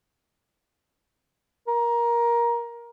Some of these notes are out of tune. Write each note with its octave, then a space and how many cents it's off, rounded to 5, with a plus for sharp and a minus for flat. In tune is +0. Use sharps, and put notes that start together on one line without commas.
A#4 +15